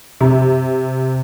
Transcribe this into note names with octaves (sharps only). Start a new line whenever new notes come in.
C3